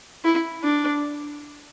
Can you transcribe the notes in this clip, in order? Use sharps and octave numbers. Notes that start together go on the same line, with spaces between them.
E4
D4